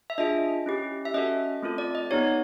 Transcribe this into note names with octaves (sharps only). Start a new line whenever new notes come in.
E5
D4 F4 G#4 D#5
C#4 E4 G4
E5
C#4 F#4 A4 D#5
A3 C4 F4 A4
D5
D#5
B3 D#4 G4 C#5